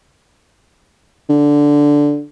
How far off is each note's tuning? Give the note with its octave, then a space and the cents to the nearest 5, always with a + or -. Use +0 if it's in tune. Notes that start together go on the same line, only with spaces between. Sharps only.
D3 -5